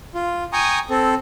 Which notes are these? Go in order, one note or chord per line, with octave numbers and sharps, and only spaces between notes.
F4
G5 G#5 A#5 C#6 D#6
C4 A4